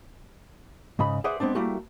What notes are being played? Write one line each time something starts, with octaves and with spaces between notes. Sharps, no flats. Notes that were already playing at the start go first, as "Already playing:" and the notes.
G#2 C#3 D#5 B5
G#4 B4 C5 D5 E5 F#5
G#3 B3 C4 D4
G3 A3 A#3 E4 F#4 G4